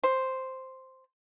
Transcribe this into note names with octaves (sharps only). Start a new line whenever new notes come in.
C5